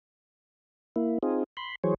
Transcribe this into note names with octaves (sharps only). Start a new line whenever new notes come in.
A#3 E4
C4 D#4 F4 G#4
B5 C6
E3 F#3 G#4 C5 C#5